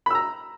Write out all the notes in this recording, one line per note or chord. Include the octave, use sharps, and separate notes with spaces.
A#5 B5 E6